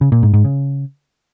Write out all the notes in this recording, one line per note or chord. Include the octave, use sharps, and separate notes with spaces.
C#3
A#2
G#2
G#2
C#3